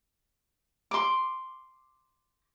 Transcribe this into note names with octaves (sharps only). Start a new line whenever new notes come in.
C6 D6